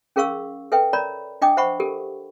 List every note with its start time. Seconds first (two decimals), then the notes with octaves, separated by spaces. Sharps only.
0.16 C#4 G#4 A#4 F5 C#6 E6
0.72 A4 B4 E5 G5
0.93 A#4 C#5 D5 A#5 B5
1.42 D4 D#5 G5 D6 D#6
1.57 C5 E5 F#5 B5 C#6
1.80 G4 A4 A#4